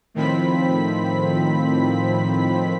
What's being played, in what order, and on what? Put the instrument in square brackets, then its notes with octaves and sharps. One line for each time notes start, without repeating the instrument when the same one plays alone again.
[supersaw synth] A2 D#3 F3 C4 B5 B6